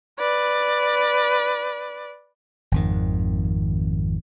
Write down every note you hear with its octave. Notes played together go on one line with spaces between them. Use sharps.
B4 D5
G#1 F2 D#3